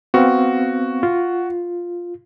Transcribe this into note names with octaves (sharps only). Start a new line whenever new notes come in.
B3 C4 F#4 F5
F4